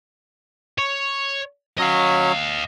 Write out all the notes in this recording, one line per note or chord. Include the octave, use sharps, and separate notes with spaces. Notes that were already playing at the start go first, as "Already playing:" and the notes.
C#5
F#3 C#4 C#5 D#5 F5